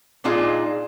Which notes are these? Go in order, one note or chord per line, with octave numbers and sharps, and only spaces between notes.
A#2 D4 D#4 F4 G#4